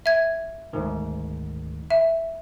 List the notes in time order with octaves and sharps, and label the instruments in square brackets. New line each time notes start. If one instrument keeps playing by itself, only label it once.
[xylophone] E5 G#6
[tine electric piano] D2 G#2 D#3
[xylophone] E5